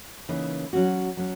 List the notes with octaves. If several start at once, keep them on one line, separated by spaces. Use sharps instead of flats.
C#3 E3 A#3 D#4
F#3 C#4 F#4
F#3 C#4